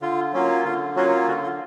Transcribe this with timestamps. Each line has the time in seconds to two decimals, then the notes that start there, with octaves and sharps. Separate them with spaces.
0.01 D3 F4
0.33 F#3 A#3 C#4 F4
0.65 D3 F4
0.96 F#3 A#3 C#4 F4 F#4
1.28 D3 F#4
1.43 F4